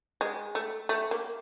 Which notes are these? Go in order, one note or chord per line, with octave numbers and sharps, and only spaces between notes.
G#3
A3
A3
A#3